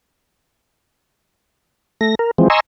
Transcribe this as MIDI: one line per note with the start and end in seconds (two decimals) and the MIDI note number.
2.01 2.15 57
2.01 2.15 94
2.19 2.31 70
2.38 2.48 52
2.38 2.48 53
2.38 2.48 56
2.38 2.48 60
2.50 2.60 75
2.50 2.60 80
2.50 2.60 82
2.50 2.60 84
2.50 2.60 85
2.50 2.60 88